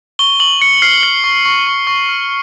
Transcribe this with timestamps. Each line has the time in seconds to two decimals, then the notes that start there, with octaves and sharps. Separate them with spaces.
0.19 C#6 G7
0.40 C#6 F#7
0.61 C#6 C#7
0.82 F6 C7
1.03 F6 C#7
1.24 C#6
1.45 C#6
1.67 C#6
1.87 C#6
2.09 F6